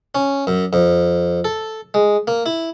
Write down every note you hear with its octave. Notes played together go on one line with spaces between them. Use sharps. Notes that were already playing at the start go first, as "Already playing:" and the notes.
C#4
F#2
F2
A4
G#3
A#3
E4